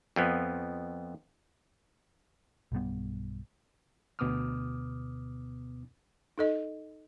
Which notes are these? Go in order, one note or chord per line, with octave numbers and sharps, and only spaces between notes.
F2 F3 B3
B1 G2 G3 B3
D2 B2 B3 D6 D#6 F6
D#4 A4 D#5